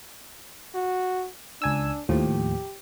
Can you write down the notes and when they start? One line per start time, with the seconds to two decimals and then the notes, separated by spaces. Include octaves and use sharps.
0.75 F#4
1.62 C#2 D4 G#5 E6
2.09 D#2 A2 F3 G4